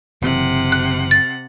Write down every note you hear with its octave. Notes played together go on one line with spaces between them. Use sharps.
F#1 C3 E3 F#5
F#6
A6